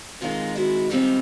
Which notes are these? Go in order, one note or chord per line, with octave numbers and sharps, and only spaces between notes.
G#2 D#3 G#3 C4 D#4 F4
E4 F#4
G#2 D#3 G3 C4 D#4 F4 G4